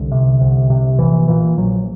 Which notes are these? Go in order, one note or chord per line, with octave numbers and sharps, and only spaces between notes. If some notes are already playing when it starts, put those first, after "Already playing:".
Already playing: C2 D3
C3
C2
C3
A#1 E3
A#2 E3
A#1 F#3